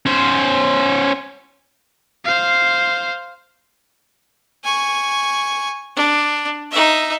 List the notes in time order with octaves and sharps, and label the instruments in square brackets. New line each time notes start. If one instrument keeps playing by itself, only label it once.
[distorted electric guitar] C#4 C5
[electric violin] C5 F5
[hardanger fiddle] G#5 C#6
D4
D#4 E5